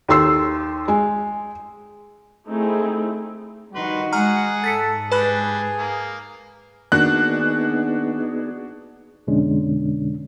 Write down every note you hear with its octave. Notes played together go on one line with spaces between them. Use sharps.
D#2 A4 C6 E6 C7
G#3
A3 C4 D#4 E4 G#4
D#3 G3 D#4 F#4 B4 C6
G#3 G#4 F#5 A#5 F6
G#2 A4 A6 B6 C#7
G3 D4 G#4 B4 B5 F#6
A#3
D#3 A#3 B3 D4 D#4 F#4 G#4 F#6
F2 B2 D3 G#3 C#4 D4